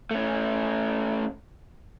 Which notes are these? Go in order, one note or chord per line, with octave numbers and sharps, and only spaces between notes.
A3 C#4